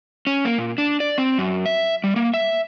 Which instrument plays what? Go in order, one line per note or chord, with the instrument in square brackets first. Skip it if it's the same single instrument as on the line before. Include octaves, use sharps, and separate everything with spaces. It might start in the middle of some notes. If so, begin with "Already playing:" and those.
[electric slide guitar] C#4
A#3
A#2
D4
D5
C4
F#2
E5
G3
A#3
E5